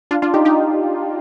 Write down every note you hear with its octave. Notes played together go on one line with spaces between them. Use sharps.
D4 F4
D4 F4
D#4 G4
D#4 G4